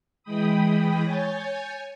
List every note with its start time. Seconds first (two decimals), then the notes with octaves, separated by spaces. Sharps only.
0.23 E3 G#3 G5 B5 D#6
1.04 C#5 G#5 G6 A6